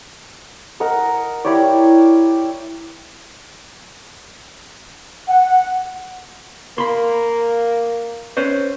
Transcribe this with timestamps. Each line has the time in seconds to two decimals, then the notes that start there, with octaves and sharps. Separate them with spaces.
0.80 A#4 D#5 F#5 A#5
1.45 E4 G4 C#5 D5
5.29 F#5
6.78 A#3 B5 C6
8.37 C#4 B4 C5